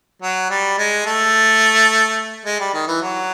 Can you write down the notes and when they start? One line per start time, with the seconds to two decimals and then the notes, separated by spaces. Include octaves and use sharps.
0.22 F#3
0.50 G3
0.78 G#3
1.06 A3
2.46 G#3
2.60 G3
2.74 D#3
2.87 E3
3.02 F#3